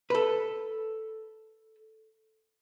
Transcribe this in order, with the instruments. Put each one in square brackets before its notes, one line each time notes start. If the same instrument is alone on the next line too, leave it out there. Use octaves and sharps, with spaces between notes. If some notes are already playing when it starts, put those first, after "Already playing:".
[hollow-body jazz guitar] A4 B4